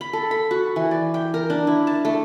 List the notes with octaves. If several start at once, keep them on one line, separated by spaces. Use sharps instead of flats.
B5
A4
B5
F#4
E3
D5
G5
A#4
D4
E4
A5
A3